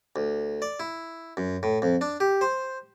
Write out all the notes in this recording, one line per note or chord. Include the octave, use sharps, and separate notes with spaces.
D2
D5
E4
F#2
A2
F2
D4
G4
C5